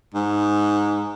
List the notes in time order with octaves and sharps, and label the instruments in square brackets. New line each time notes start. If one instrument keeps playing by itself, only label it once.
[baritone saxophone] G#2